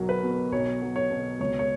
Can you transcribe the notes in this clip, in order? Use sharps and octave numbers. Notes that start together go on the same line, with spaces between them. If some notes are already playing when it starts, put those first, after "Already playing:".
Already playing: B1 F#3 A#4
B4
B2
B1 C#5
F#3
C#5
B2
C#2 C#5
C#5